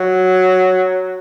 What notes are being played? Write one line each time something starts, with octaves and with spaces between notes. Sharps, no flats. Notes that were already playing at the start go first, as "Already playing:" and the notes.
Already playing: F#3